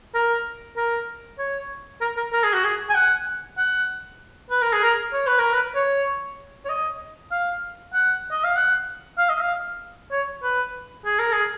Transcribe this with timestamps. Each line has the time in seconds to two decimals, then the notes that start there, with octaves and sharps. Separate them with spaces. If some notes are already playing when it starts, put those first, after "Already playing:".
0.14 A#4
0.77 A#4
1.39 C#5
2.02 A#4
2.17 A#4
2.33 A#4
2.44 G#4
2.54 F#4
2.65 G#4
2.90 G#5
2.95 F#5
3.58 F#5
4.51 B4
4.62 A#4
4.73 G#4
4.84 A#4
5.13 C#5
5.27 B4
5.39 A#4
5.53 B4
5.75 C#5
6.65 C#5
6.69 D#5
7.31 F5
7.94 F#5
8.32 D#5
8.44 F5
8.56 F#5
9.18 F5
9.30 D#5
9.41 F5
10.12 C#5
10.43 B4
11.06 G#4
11.19 A#4
11.33 G#4